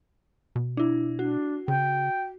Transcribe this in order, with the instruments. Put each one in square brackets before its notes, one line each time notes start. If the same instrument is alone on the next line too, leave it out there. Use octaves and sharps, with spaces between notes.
[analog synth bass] B2
[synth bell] D4 E4
[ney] D4 [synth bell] F#4
[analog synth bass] C#3 [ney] G5